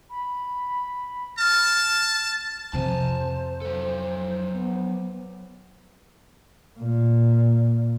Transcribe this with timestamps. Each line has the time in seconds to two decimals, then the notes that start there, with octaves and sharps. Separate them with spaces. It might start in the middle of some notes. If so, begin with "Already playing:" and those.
0.10 B5
1.38 A5 F6
2.73 F2 C3 C5 G#5 A5
3.62 F#3 A4
4.53 B3
6.79 A#2